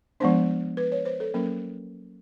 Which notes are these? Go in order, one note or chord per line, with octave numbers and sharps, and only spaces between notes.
F3 G#3 B3 D4 C5
B4
C#5
C5
A4
F#3 A#3 C#4 A#4